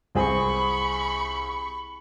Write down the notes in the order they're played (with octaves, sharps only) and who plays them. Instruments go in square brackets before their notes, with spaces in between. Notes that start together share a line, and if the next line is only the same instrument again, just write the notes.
[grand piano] C2 C4 G#4 [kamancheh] B5 C#6